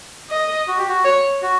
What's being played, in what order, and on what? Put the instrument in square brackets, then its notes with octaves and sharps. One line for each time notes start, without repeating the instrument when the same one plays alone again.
[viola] D#5
[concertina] F#4
G4
F#4
[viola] C#5
[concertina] F#4